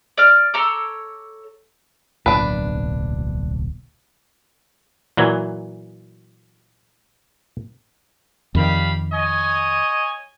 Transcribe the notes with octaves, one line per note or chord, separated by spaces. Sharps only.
D5 F6
A4 C#5 A#5 D6
D1 B1 A#3 D4 B4
A#2 E3 F#3
F2 D#3 G3 F5 B5
C#5 D#5 G#5